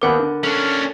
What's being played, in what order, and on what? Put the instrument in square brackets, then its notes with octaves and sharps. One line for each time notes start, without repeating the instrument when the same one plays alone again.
[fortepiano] D#2 B3 D6 [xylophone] A#4 F#5 B5
[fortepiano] D3
[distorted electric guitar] C#4 D4 [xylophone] A4 F#6 F#7